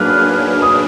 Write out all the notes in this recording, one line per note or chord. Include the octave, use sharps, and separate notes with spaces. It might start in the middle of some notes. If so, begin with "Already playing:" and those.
Already playing: F#3 A#3 D4 G#4 B4 F6 F#6
D#6